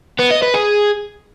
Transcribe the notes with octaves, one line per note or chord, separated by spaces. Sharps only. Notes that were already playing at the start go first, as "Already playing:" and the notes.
B3
D#5
B4
G#4